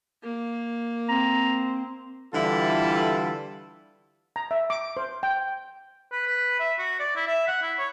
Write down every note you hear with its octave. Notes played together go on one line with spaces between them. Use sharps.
A#3
C4 A#5
D3 E3 G3 E4 F4 A4
A#5
E5
D6
C5
G5
B4
B4
E5
F#4
D5
E4
E5
F#5
E4
C#5